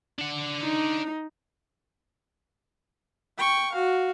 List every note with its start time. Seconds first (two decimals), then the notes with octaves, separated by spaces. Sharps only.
0.19 D4 F#5
0.62 D#4
3.38 G5 C#6
3.72 F#4 F5